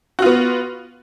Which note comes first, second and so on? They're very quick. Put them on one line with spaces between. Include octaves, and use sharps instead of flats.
F#4 F4 B3